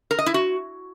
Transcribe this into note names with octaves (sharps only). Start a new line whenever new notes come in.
A#4
D#5
E4
F#4